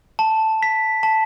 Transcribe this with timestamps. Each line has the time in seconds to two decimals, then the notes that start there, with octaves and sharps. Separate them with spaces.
0.19 A5
0.63 B6
1.03 A5